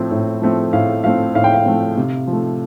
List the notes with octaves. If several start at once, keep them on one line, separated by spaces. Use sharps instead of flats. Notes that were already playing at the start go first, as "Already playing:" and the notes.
Already playing: A2 F3 A3 C4
A2
F3 A3 C4
A2 F5
F3 A3 C4 F5
A2 F5
G5
F5
F3 A3 C4
C3
F3
A3